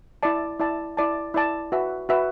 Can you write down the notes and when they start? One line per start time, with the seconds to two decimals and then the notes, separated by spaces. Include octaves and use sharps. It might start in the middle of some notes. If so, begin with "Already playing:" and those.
0.23 E4 D5 A5
0.59 E4 D5 A5
0.97 E4 D5 A5
1.34 E4 D5 A5
1.72 F#4 B4 E5
2.09 F#4 B4 E5